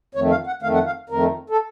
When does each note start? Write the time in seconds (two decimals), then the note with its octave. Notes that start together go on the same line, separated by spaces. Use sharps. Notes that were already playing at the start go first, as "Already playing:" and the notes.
0.15 F2 D#3 A3 C#5
0.31 F5
0.47 F#5
0.62 F2 D#3 A3 F5
0.74 F#5
0.86 F5
1.09 F2 D#3 A3 A#4
1.50 A4